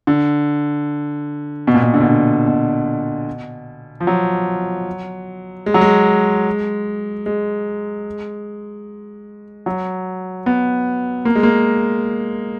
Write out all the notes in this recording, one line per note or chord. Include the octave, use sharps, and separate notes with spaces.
D3
B2
A#2
B2
D3
B2
D3
B2
F3
F#3
G#3
F#3
G#3
G#3
F#3
B3
A#3
G#3
A#3